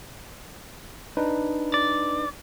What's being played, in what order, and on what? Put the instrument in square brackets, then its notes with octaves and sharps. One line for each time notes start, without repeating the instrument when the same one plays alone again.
[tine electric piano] D4 D#4 B4
[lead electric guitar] D5